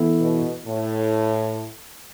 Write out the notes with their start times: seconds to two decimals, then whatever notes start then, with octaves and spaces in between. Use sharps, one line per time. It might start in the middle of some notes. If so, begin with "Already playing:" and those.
Already playing: E3 B3 E4 A4
0.19 B2
0.66 A2